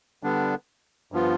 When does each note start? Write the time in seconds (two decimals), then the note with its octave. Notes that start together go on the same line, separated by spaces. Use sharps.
0.23 D3 G3 B3 D4
1.12 G2 F3 B3 F4